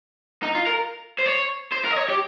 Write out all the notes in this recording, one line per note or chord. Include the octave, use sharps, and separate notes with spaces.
D#4
F4
A#4
C5
C#5
C5
A#4
D#5
C#5
G4